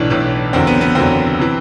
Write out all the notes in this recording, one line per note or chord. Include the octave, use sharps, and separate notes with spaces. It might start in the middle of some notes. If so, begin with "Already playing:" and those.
Already playing: B1 A2 E3 D4
B1 A2 E3
F#1 E2 D3 F#3 C4
B3
B3
F#1 E2 D3 F#3 C4
C3 E3